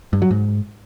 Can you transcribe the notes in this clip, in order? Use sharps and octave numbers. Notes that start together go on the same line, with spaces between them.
G2
F#3
G#2